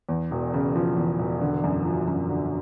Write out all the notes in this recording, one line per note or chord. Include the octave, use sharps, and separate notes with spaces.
E2
E1
C#3
F3
E2
E1
D3
F#2
F3
F#2
D3